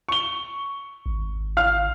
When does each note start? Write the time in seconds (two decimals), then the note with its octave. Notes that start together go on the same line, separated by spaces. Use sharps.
0.09 C#6 G7
1.06 G#1
1.57 F5 F6